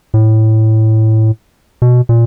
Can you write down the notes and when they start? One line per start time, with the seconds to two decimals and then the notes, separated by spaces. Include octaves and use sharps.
0.14 A2
1.82 B2
2.09 A#2